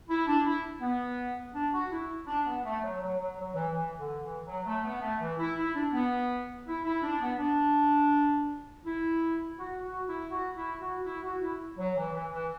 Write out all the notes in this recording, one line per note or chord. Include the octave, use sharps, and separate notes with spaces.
E4
D4
E4
B3
D4
F#4
E4
D4
B3
A3
F#3
F#3
F#3
F#3
E3
E3
D3
E3
F#3
A3
B3
A3
E3
E4
E4
D4
B3
E4
E4
D4
B3
D4
E4
F#4
F#4
E4
F#4
E4
F#4
E4
F#4
E4
F#3
E3
E3
E3